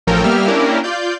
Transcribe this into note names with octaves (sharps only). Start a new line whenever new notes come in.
A1 F3 C#4 A4 A#4 G5
G3 A#3 B3 G4 E5 F6
A#3 C#4 D4 E4 G4 A#4
F4 D5 G6